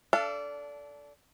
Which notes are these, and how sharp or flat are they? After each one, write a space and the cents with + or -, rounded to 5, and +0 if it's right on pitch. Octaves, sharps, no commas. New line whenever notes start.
D4 -20 A4 +0 F5 -45